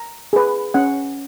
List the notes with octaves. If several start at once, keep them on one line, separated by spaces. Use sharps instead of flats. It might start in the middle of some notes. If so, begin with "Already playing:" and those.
Already playing: A#5
G#4 B4
C#4 F#5